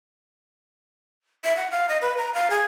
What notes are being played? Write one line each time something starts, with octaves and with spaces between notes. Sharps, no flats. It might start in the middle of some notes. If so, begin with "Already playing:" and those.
E5
F#5
F5
D#5
B4
A#5
F5
G#4